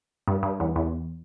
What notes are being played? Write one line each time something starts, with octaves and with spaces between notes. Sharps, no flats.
G2
G2
E2
E2